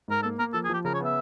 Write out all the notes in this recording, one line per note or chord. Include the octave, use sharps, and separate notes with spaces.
G#2 A#4
A#3 A4
A#3 A#4
F3 A4
G#4
F3 G4
C#3 A#4
C#5
B3 E5